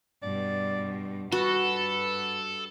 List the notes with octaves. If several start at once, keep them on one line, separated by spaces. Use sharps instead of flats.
G2 B2 D5
G2 F#4 A4 B4